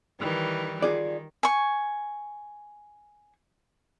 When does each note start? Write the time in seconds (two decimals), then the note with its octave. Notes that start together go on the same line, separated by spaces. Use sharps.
0.20 D#3 E3 G3
0.82 D#3 F4 G#4 D5
1.43 G#5 C#6